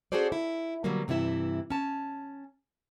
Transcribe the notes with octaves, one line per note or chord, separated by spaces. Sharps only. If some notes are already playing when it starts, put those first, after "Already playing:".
C#4 F#4 G#4 A4 C5 D5
E4
B2 D3 F#3 G3 A#3
G2 C3 E3 E4 E5
C#4 A5